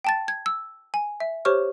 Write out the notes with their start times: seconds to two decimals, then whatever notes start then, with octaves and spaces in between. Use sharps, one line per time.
0.05 G5 A5 A6
0.28 G#6
0.46 E6
0.94 G#5
1.20 E5
1.45 G4 C5 C#5 C#6 F6